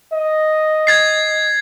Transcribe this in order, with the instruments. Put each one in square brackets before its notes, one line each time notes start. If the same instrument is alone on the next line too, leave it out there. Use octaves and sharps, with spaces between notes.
[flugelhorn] D#5
[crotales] G#6 A6 C7